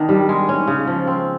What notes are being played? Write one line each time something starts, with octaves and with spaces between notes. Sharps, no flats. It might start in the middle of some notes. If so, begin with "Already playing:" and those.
Already playing: D#3 B3 D4
G3
G#3
C#4
C#3
F3
C4